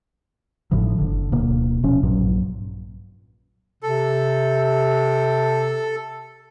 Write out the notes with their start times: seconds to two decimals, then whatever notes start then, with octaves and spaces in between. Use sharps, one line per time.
0.71 G#1 A2 D3 F3
0.98 F#1 D3
1.32 D1 B2 A#3
1.83 D#1 C3 F3 C#4
2.03 A#1 G2 A#2 F#3
3.83 C3 A4